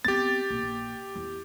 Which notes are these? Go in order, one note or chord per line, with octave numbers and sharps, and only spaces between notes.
B3 C4 G4 A6
A#1
E2